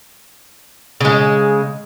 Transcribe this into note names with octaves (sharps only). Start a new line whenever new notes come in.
C#3 G#3